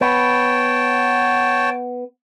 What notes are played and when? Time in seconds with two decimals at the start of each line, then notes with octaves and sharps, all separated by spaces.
0.01 B3 C#5 G5 A5